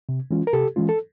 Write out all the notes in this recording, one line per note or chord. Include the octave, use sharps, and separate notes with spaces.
C3
E3 G#3 C#4 F4
A#4
C3 G4 A4
E3 G#3 C#4 F4
A4